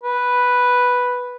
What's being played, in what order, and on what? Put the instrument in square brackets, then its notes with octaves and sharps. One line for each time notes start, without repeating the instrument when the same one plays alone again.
[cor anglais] B4